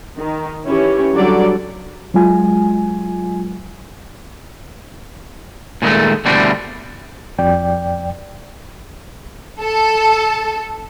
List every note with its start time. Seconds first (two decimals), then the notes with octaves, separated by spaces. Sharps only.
0.18 D#3
0.66 E3 C#4 E4 G4 C#5
1.15 D3 F#3 G3 A4 D5
2.14 F#3 G#3 F4 G#5
5.82 A#2 D#3 F3 G#3 A3
6.25 B2 D3 E3 G3 A3 C4
7.39 F2 D5 G5
9.61 A4